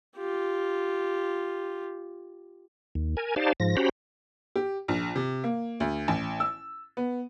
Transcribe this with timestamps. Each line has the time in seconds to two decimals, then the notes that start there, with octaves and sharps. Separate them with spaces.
0.16 F4 G4
2.95 D#2
3.17 A#4 G#5
3.36 D#4 G4 C5 D5 F5 A5
3.60 G#2 F3 A#6
3.77 C#4 F#4 G4 C5 A#5 B5
4.56 G4
4.88 A#1
5.16 C3
5.44 A#3
5.80 D2
6.08 A1
6.40 E6
6.97 B3